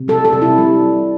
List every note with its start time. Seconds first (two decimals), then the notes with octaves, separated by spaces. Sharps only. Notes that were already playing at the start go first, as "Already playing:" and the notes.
Already playing: C3
0.08 G3 A4
0.25 A4
0.33 C3
0.42 E4
0.58 G3